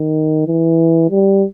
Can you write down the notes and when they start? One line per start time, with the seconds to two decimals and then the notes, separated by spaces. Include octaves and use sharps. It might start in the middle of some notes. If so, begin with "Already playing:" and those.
Already playing: D#3
0.47 E3
1.11 G3